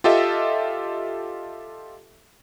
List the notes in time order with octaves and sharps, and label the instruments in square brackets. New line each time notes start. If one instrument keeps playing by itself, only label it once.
[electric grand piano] F4 G4 A4 D#5 E5